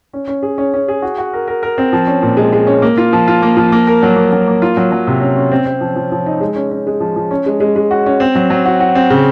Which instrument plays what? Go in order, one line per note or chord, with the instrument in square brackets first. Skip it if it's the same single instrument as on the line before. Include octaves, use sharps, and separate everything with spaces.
[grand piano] C#4
C#4
G#4
C#4
C#4
G#4
F#4
F#4
A#4
A#4
A#4
C4
F3
C#4
A#2
G#3
G#3
C#4
A#3
F4
F3
F4
A#3
F3
A#3
A#4
F#3
A#3
F#3
A#3
F4
F#3
F#3
C3
C#4
C#4
C4
C4
F3
F3
F3
D#4
G#3
C#4
C#4
G#3
F3
F3
C#4
G#3
G#3
G#3
F#4
C#4
C4
F#3
F#3
F#4
F#4
C4
C#3